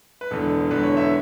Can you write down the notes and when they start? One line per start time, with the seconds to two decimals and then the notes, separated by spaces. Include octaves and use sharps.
0.21 B4
0.31 E1 E2 D3 A4
0.71 E1 E2 D3 B4
0.83 C#5
0.97 E5